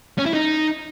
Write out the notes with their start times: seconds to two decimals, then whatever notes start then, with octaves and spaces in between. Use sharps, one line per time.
0.18 C#4
0.26 E4
0.34 D#4